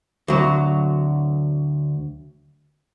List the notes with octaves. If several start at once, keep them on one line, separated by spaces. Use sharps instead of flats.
D2 F#3